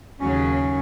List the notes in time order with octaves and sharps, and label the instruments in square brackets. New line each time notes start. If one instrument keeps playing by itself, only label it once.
[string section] D#2 C#3 F#3 [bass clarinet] C#4